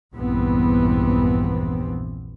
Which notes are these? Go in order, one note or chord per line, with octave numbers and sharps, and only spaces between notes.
A#1 E2 G2 E3 B3 C4